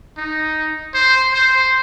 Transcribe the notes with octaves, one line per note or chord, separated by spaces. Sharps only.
D#4
C5
C5